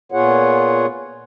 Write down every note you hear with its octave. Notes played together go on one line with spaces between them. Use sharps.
A#2 B3 F4 G#4 C#5 F#5